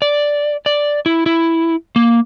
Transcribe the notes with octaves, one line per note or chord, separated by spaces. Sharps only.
D5
D5
E4
E4
A#3